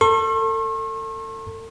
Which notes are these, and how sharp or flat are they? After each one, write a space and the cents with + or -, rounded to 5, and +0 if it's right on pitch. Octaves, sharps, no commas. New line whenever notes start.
A4 +35 C#6 -45